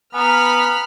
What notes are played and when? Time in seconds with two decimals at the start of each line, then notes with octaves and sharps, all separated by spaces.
0.14 B3 G#5 A#5 B5 F6